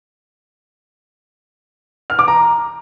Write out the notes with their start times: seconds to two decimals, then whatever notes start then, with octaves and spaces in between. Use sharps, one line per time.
2.10 F6
2.19 D6
2.28 A#5